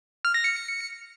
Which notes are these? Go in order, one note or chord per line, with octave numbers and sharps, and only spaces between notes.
F6
A#6
C#7